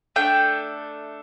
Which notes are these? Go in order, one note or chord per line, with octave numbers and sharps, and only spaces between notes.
A3 D4 A4 G5